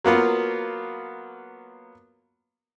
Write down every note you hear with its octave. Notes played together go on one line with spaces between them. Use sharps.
F#3 A#3 B3 F4